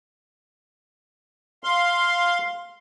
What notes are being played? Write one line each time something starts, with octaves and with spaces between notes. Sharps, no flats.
F5 C6